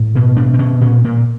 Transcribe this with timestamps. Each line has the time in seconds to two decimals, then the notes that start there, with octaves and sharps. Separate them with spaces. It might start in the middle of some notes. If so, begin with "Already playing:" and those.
Already playing: A2
0.15 B2
0.37 B2 D4
0.54 C4
0.59 B2 C#4
0.81 A#2 C#4
1.04 A#2 A#3